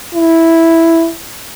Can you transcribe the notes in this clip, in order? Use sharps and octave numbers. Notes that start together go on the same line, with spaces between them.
E4